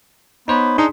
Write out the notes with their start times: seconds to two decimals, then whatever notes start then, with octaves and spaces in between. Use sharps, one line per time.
0.48 B3 D#4 C5 C#5
0.78 D4 D#4 G#4 C6